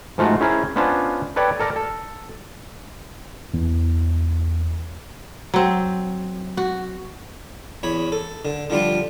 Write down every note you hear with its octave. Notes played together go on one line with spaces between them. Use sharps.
G#2 F3 A3 F4 F#4
C#4 E4 G#4 A#4 C5
B3 C#4 D4 F4 C5
A4 B4 C#5 D5 G5
A4 A#4 D5 A#5
A4
E2
F#3 C4
F#4
E2 C#5 B5
A4
D3
D3 F3 G3 D4 F4